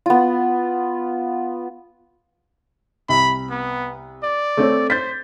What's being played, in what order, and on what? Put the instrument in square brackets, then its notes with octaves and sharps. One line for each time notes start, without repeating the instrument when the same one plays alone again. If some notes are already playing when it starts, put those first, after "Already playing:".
[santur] B3 F4
[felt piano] C2 [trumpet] B5
[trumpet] B3
D5
[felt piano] A3 C4 C#5
[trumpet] C5 [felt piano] G6 A6 B6